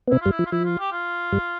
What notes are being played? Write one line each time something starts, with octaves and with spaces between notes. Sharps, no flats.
B3
C3 C4 E4
G2 G3 F4
E4
F3
F4
F3 E4
F4
G4
F4
G2 G3